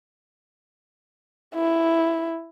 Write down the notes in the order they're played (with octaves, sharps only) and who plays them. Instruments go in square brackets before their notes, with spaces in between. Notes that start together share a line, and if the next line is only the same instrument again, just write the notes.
[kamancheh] E4